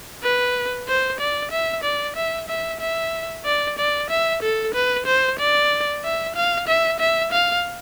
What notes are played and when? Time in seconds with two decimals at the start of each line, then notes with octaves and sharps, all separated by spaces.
0.23 B4
0.88 C5
1.20 D5
1.51 E5
1.84 D5
2.16 E5
2.48 E5
2.80 E5
3.45 D5
3.78 D5
4.10 E5
4.43 A4
4.74 B4
5.06 C5
5.39 D5
6.04 E5
6.36 F5
6.68 E5
7.00 E5
7.32 F5